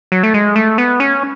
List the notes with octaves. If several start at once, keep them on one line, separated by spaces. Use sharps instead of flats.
F#3
A3
G#3
A3
B3
C#4